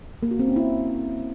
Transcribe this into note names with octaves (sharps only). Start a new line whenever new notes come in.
A#3
F#4
C4
C#4
E4